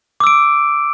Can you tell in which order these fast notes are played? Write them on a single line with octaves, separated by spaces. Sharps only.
D6 E6 D7